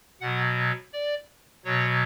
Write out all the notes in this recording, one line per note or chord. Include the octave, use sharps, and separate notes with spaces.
B2 F#3 F#5
D5
B2 F#3 C#5